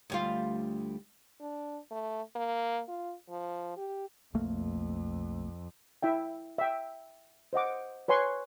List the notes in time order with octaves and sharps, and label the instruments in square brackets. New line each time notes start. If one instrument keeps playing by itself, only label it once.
[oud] D2 G3 F4
[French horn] D4
A3
A#3
F4
F3
G4
[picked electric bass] B1 A3 A#3 [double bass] F2
[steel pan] E4 E5 G5
E5 G5
C5 D#5 F#5 D6
B4 C#5 G#5 C6 C#6